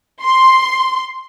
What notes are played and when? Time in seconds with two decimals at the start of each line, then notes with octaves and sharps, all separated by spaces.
0.24 C6